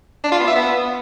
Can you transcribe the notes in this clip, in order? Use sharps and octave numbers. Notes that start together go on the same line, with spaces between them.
D4
F4
B3
E5
B3